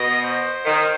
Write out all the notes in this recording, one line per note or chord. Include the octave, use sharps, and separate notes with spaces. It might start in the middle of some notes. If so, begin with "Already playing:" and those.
Already playing: B2 D#5
C5
D#3